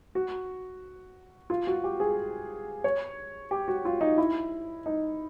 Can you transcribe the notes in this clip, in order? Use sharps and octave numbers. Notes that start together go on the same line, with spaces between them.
F#4
F4
F#4
G4
G#4
C#5
G4
F#4
F4
D#4
E4
D#4